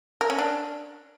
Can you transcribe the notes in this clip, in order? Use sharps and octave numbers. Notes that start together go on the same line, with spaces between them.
A#4
C#4
D4